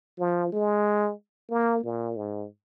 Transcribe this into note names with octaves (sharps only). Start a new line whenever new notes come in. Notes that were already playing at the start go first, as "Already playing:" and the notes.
F3
G#3
A#3
A#2
G#2